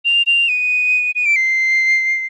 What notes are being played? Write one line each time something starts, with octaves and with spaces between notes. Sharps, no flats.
F7
F7
D#7
D#7
D7
C7